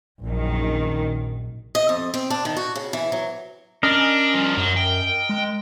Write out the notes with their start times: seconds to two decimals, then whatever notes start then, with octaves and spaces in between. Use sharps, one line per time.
0.24 A#1 F#2 D#3
1.75 D#5
1.89 F2
2.14 C4
2.30 D4
2.45 D#3
2.57 F#4
2.76 C#3
2.93 E3
3.12 F#3
3.83 C#4 D4 A#4 D#5
4.34 G2 F3
4.57 F#2 F#3
4.77 G5
5.29 G#3